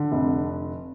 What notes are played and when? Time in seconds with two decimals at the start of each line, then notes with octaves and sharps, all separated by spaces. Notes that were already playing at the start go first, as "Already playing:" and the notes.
Already playing: D3
0.12 F1